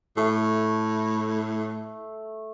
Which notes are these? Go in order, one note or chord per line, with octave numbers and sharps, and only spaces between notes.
A2 A3